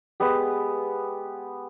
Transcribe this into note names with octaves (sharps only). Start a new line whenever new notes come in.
G#3 B3 G4